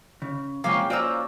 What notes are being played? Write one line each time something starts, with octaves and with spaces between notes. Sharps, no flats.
C#3
C3 F3 G#3 A#3 C#4 F5 G5
F4 F#4 C5 D5 A#5 E6